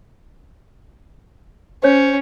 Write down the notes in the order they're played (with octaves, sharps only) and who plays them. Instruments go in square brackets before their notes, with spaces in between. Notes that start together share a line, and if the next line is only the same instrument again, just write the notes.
[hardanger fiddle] C#4 [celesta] C5 C#5 G6